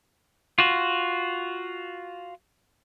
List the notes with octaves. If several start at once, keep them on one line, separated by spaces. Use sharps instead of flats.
F4 F#4